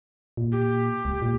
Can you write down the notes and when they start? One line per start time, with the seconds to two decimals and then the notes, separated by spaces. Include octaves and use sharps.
0.37 A#2
0.52 G4
1.05 C#2
1.22 A#2